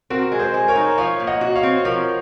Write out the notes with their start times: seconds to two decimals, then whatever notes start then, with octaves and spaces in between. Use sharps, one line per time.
0.10 C4 F#4 A#4
0.32 G#3
0.39 G#4 C5
0.54 G#3
0.68 A#4 C#5
0.76 D#4
0.98 F3 C#5 F5
1.20 A#2
1.27 D#5 F#5
1.41 F#4
1.55 C#5 F5
1.63 C4
1.85 F3 A#4 C#5